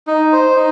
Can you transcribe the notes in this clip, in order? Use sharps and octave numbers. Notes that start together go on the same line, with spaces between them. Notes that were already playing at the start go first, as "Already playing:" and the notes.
D#4
C5
D#4